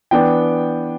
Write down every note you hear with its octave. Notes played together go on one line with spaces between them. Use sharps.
E3 B3 D4 G5